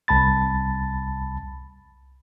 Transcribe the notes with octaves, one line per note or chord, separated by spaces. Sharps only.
C2 A5 B5 A6